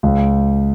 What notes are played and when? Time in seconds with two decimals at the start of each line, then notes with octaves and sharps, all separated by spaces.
0.03 C#2